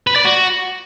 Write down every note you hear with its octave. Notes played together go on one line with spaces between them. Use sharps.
B4
D5
F#4